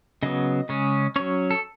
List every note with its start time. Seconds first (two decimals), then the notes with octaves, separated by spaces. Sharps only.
0.23 C#3 F#3 B3 D#5
0.69 C#3 G#3 C#4
1.16 F#3 C#4 C#5
1.51 A4